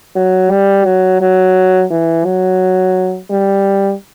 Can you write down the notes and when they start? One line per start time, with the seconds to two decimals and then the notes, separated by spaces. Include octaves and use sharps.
0.16 F#3
0.51 G3
0.85 F#3
1.21 F#3
1.91 E3
2.25 F#3
3.31 G3